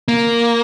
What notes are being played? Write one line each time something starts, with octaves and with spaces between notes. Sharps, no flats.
A#3